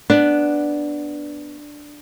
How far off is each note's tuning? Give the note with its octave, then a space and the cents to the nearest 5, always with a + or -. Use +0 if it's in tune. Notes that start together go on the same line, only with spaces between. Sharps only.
B3 +0 D4 +0